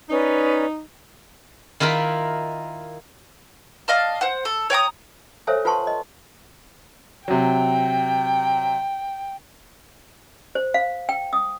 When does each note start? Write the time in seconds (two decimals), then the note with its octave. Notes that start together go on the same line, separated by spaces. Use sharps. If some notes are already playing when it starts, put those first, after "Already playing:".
0.09 C#4 D#4 B4 D5
1.80 D#3 E4 F4 A#4 B5
3.88 D5 D#5 F5 A5
4.21 C5 F#5
4.45 A4
4.70 C#5 G5 A#5 D#6
5.47 A4 C5 C#5 E5 F5 G#5
5.65 F4 B4 F#5 A5 C6 C#6
5.87 D#5
7.28 C3 F#3 G5
10.55 C5
10.74 F5
11.09 G5
11.33 D#6